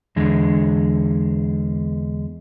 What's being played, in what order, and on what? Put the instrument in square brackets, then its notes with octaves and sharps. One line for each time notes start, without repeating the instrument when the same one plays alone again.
[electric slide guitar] E2 D3 G#3